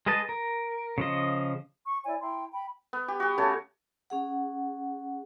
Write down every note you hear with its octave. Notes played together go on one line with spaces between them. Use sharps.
G#3 G#4 B4 D#5 A5
A#4
C#3 F3 D#5
C#6
E4 C#5 D5 G#5
E4 G5 A#5 C6
G5 B5
B3
G4
F#4 G4
C#3 A3 C#5 A5
C#4 G#4 F#5